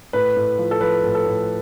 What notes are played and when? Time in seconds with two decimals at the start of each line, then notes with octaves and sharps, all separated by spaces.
0.13 A2 B4
0.36 A2
0.58 F3
0.71 A4
0.81 F3 B4
1.04 A2
1.15 A4
1.26 A2